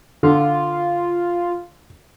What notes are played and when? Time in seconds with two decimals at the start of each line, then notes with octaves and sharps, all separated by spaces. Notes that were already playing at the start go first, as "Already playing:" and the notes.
0.23 D3 F4